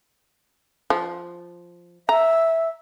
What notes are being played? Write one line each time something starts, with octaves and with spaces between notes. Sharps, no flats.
F3
E5 A#5